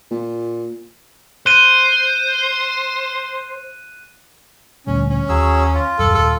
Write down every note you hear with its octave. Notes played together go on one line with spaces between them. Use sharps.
A#2
C5 F#6 D#7
D2 A#2 G3 C#4
C#4
D#2 F#3 G#4 E6
F4
D#1 F#2 A4
D#1 A4